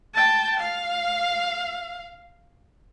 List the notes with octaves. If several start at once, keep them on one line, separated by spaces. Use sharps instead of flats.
G5 A5
F5